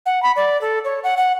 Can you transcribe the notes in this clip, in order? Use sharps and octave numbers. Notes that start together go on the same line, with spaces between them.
F#5
B5
D5
A4
C#5
F#5
F#5